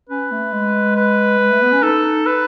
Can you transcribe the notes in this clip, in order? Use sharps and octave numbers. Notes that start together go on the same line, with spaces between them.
C#4 B4
A3
G#3
B4
G#3
A3
B3
C#4
D#4 A4
B4